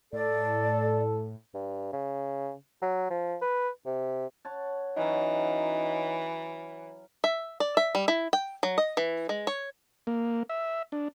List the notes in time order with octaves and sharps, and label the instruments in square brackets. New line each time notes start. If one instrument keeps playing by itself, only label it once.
[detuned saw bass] A2 [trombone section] A4 [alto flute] D5
[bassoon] G2
C#3
F#3
F3
B4
C3
[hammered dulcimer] C#5 F#5 A5
[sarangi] E3 [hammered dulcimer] F#3 C#4 F#4 [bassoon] D#4
[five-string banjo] E5
D5
E5
G3
E4
G5
F#3
D#5
E3
G#3
C#5
[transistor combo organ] A#3
E5
D4